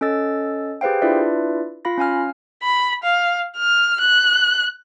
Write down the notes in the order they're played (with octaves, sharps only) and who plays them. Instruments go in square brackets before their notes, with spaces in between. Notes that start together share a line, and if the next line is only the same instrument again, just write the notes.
[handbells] C#4 A4 D#5 E6 A6
G4 G#4 B4 C5 F5 G5
D4 E4 F4 B4 D5 E5
F4 F5 B5 A#6
C#4 F5 G#5 F6
[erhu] B5
F5
F6
F#6